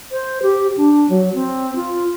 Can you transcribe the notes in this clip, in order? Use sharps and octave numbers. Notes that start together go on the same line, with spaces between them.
C5
G4
D4
F#3
C4
F4